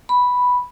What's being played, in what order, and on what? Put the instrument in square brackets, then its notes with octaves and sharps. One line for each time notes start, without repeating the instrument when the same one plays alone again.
[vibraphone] B5